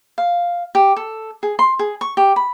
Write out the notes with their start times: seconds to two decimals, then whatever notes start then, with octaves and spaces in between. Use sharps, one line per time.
0.18 F5
0.75 G4
0.96 A4
1.43 G#4
1.59 C6
1.79 G#4
2.01 C#6
2.17 G4
2.36 B5